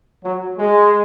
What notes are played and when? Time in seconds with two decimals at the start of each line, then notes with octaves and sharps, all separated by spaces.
0.23 F#3
0.58 G#3